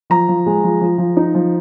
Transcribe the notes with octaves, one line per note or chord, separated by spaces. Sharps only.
F3 A#5
F3
G#3
F3
F3
F3
D#4
F3